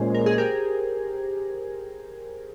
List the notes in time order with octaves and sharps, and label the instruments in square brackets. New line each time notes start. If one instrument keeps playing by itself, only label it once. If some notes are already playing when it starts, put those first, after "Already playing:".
Already playing: [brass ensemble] A#2 G#3 C#4 [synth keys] G#4 C5
[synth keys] A#4
G#4
G4 A#4